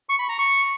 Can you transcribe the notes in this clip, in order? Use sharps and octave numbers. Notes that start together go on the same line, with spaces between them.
C#6
B5
A#5
C#6